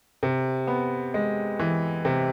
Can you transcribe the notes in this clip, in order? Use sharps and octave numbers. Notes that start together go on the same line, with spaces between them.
C3
B3
G#3
E3
C3